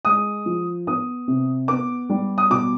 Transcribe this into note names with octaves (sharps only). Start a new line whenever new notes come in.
G#3 D#6
F3
B3 D#6
C3
B3 D6
G3
D#6
B2 D6